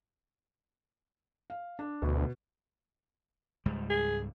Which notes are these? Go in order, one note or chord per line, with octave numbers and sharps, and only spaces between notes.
F5
D4
D2 B2
C#2 G#2 G3
G#4